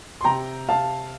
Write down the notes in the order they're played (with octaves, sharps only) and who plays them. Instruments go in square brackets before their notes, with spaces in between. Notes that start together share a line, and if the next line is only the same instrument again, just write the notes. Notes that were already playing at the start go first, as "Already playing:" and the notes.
[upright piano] C6
C3 G5 A#5
C3 F5 A5